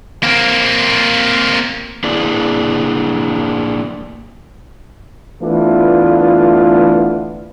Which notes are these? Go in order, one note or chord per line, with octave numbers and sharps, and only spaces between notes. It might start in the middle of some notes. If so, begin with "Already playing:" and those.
A#3 C4
A#3 D4 E4 G#4 D5
D2 E3 A3 B3 D4 F4